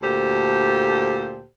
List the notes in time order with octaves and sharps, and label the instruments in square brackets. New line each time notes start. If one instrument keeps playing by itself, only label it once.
[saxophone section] D2 A#2 G4 A4 C5